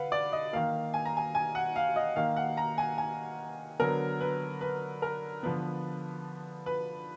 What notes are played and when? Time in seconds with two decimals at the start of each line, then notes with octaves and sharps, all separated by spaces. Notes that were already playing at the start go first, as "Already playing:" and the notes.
Already playing: D3 B4 F5 F#5
0.12 D5
0.32 D#5
0.53 D#3 A#3 F5
0.94 G#5
1.05 A#5
1.17 G#5
1.35 G#5
1.55 F#5
1.76 F5
1.96 D#5
2.16 D#3 A#3 F5
2.36 F#5
2.57 A#5
2.78 G#5
2.98 G#5
3.79 D3 F#3 B3 A#4
4.21 B4
4.61 B4
5.02 A#4
5.43 D3 F3 B3 B4
6.66 B4